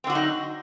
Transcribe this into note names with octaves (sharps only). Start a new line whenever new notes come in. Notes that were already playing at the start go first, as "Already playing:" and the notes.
D3 F#3 C4 D#4 F#4